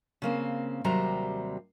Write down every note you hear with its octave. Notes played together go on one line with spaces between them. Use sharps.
C#3 A#3 C4
D#2 C3 F#3 G3 C5 A#5